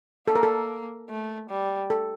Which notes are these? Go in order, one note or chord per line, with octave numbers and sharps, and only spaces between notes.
A#3 A4
A#4
A4
A3
G3
A4